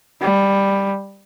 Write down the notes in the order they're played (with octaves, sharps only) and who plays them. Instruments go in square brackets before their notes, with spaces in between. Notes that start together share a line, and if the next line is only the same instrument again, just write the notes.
[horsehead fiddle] G3